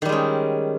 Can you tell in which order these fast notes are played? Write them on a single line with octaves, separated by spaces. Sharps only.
D#3 G3 G#3 C#4